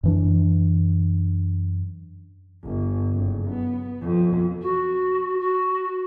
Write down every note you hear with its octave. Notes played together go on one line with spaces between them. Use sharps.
F#2 E3 D4
G1
F#1
B3
F2
F#4
F#4